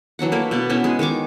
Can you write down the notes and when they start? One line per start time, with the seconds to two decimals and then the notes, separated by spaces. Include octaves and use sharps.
0.19 E3 F#3 D4 F#5
0.32 A3 A#3 E4
0.51 B2 B3 D5
0.70 B3 C#4 E4 F#4
0.84 G#3 G#4
0.99 D#3 G#3 C#6 D6